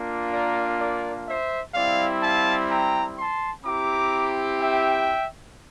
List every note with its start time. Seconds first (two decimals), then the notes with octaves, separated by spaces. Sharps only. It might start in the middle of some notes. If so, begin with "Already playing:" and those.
Already playing: A#3 D4 F4
0.32 A#4 D5
0.80 A#4 D5
1.28 C5 E5
1.75 G3 C4 E4 D5 F5
2.22 F5 A5
2.70 G5 A#5
3.18 A5 C6
3.64 C4 E4 G4 A#5 D6
4.59 E5 G5